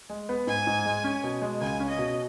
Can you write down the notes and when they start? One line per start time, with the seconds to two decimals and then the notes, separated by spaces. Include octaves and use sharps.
0.10 G#3
0.29 B3
0.47 G#2 G#5
0.67 G#2
0.85 G#3
1.04 C#4
1.23 B2
1.42 G#3
1.61 C#2 G#5
1.80 C#4
1.89 D#5
1.98 B2